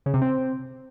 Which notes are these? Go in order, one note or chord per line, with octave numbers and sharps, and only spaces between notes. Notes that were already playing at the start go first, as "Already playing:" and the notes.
C#3
C3
C4